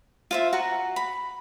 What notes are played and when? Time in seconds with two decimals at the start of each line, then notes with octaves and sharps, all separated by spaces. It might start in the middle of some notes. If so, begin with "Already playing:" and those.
0.31 F4 C5 E5
0.53 F#4 F#5 A#5
0.96 B5